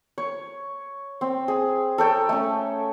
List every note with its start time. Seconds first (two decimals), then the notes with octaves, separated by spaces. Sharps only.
0.18 C#5
1.21 C4
1.48 G#4
1.98 A4 C#5 G5 A#5
2.29 A3 C#4